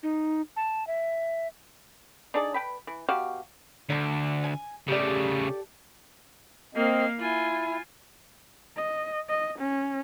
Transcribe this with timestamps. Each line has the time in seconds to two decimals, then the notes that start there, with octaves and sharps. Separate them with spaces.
0.03 D#4
0.56 A5
0.87 E5
2.34 D4 D#4 G#4 D5
2.54 B4 G5 B5
2.87 E3
3.09 B2 F#4 G4 F5
3.90 D2 D3 D4
4.44 G#5
4.88 C#3 A3 G4 A4 D5
6.75 A#3 C4 D#5 F5
7.19 E4 F4 G#5
8.77 D#5
9.29 D#5
9.59 C#4